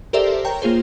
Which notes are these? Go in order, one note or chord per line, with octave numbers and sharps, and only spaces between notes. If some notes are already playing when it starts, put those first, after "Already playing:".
G4 A4 A#4 C5 D5 E5
C#5 G5 A#5
A#3 F4 G#4 C5